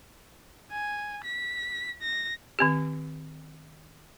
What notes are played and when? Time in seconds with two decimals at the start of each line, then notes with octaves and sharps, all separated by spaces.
0.72 G#5
1.24 B6
2.02 A#6
2.59 D#3 C4 G4